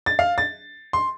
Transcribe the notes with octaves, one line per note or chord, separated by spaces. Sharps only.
A6
F5
A6
C6